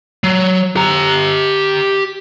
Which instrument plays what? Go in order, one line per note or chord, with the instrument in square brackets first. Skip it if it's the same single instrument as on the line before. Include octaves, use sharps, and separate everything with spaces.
[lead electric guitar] F#3
G4 A#5